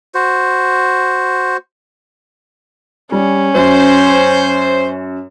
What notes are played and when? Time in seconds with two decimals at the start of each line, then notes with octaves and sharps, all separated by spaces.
0.15 F#4 C5
3.12 G3 C#4
3.55 F#2 C5